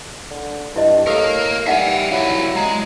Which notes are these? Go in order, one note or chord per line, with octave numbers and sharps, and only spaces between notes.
D3
G2 E4 D#5
A2 G4 A4 A#4 F5 E6
G3 D#4 E5 F#5 G#5
F#3 E4 G4 F5
G#3 A#5